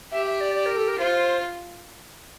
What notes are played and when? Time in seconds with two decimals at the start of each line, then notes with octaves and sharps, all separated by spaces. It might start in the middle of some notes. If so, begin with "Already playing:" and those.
0.12 G4 E5
0.26 E5
0.41 D5
0.55 D5
0.66 A#4
0.77 A4
0.88 A#4
0.98 F4 C5